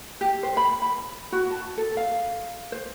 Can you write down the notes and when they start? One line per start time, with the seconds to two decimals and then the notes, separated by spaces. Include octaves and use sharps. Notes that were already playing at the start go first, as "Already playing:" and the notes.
0.21 G4
0.43 C5
0.57 B5
0.82 B5
1.32 F#4
1.51 A5
1.77 A4
1.97 F5
2.72 C5